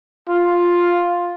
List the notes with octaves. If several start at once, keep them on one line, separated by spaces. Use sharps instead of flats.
F4